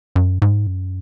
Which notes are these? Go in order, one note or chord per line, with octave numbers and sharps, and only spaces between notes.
F#2
G#2
F#2